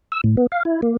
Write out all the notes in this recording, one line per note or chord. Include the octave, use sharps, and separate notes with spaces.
E6
A2
B3
F5
E4
A#3